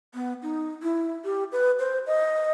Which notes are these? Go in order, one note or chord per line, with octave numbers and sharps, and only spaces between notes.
B3
D#4
E4
G4
B4
C5
D#5